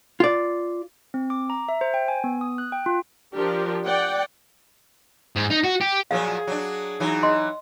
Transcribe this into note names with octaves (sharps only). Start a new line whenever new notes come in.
F4 D5
C4
D6
A#5
E5
C5
G5
G#5
B3
D#6
F#6
G5
F4
F3 D4 G4 A#4
D5 F#5 G5
G#2
D#4
F#4
G4
A#2 F3 F#3 G#4 F5
F#3 D4
E3 F#3 D#4
D#5 C6